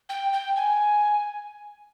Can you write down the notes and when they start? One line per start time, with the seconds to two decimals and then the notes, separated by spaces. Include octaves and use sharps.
0.09 G5
0.33 G5
0.56 G#5